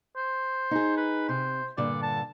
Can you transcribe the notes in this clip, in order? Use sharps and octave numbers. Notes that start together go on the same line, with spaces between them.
C5
D#4 G#4
B4
C3 C5
G2 A#2 D3 D5
A5